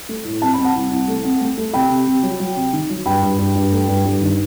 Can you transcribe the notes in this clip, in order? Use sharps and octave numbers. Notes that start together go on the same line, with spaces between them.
A3
A2
C4 A5
C4 B5
F#5 A5
C2
C2
A3
C4
A3
A3
C3 G5 B5
C3
C3
F#3
F#3
C3
D#3
F#3
G2 G5 B5
G2
G2
G2
A3
G2
G2
D#3